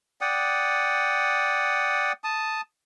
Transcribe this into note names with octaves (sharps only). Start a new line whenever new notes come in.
D5 F#5 G5 D#6
A5 D#6